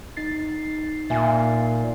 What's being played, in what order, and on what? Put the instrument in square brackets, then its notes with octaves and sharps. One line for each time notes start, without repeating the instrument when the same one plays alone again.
[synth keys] D#4 A6 C7
[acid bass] A#2 [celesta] E5 G#5